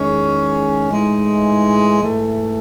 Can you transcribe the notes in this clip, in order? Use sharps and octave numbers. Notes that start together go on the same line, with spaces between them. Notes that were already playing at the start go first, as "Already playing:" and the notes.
Already playing: E2 D#3 G#3 C#4
A2 E3 G#3 D#4
G#2 E3 A3